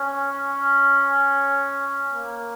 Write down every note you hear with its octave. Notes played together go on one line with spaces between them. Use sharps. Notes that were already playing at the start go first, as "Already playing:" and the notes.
Already playing: C#4
A#3